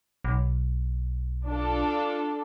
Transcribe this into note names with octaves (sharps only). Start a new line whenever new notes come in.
B1
D4 F4 A4